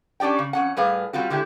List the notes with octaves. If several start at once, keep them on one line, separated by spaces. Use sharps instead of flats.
C#4 D4 G4 D5 G5
C#3
F2 C#4 F#5
A2 G3 G#4 B4 F5
G3 C4 F4 F#4
D3 G#3 E4 G4